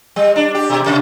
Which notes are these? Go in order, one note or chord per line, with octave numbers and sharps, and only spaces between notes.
G3
D4
G4
B2
C3